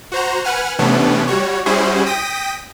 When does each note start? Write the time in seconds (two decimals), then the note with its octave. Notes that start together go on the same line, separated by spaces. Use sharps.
0.12 F#4 C5 A#5
0.44 B4 F#5 G#5 F6
0.79 C3 E3 A3 B3 C#4 D4
1.27 G3 F#4 C#5
1.66 G3 C#4 E4 F#4 G#4 C5
2.06 G5 D#6 A#6 B6 D#7